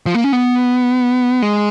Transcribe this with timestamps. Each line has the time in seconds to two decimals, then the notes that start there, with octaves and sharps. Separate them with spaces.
0.06 F3
0.15 A#3
0.24 C#4
0.32 B3
1.42 G#3